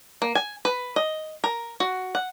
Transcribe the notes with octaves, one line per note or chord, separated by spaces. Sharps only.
A#3
G#5
B4
D#5
A#4
F#4
F#5